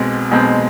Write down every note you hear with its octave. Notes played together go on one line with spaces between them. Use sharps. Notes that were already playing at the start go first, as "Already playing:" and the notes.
Already playing: B1 B2 G#3 C4
B1 B2 G#3 C4